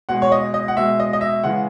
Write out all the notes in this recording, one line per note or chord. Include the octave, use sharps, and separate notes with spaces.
B2 G#3 F#5
C#5
D#5
D#5
F#5
B2 G#3 E5
D#5
D#5
E5
C#3 E3 G#3 F#5